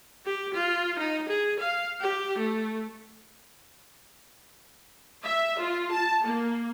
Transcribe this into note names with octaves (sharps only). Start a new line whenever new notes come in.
G4
F4
D#4
G#4
F5
G4
A3
E5
F4
A5
A#3